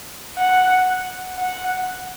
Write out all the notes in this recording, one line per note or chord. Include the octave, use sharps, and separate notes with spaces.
F#5
F#5